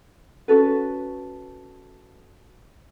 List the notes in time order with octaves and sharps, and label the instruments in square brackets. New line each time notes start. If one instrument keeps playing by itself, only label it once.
[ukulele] C#4 F#4 A4 B4